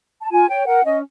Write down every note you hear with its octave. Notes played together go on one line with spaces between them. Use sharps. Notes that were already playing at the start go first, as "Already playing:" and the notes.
A5
F4 G#5
C#5 G5
A#4 F#5
C#4 D#5